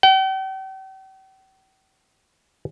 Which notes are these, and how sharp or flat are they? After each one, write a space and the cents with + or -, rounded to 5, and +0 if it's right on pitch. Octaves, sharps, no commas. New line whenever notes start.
G5 -40